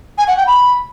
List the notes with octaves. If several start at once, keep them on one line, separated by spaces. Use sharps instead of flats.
G#5
F#5
G5
B5